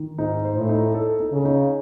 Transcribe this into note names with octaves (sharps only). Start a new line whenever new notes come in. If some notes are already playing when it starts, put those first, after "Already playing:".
Already playing: D#3
G#2 D#4
C5
A2
D#4
A4
D#4
C#3
D#4